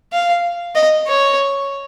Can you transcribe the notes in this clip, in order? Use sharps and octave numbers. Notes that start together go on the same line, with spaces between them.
F5
D#5
C#5